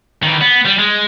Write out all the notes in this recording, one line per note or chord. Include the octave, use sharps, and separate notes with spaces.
D#3 E3
B3
G3
G#3